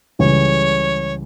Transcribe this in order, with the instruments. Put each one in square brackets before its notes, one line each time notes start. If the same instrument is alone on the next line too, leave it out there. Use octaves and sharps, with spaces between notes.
[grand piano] C#2 C#3 E3 G3 [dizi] C#5